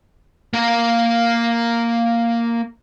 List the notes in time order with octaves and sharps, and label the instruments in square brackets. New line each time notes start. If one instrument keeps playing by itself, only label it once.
[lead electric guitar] A#3 A#4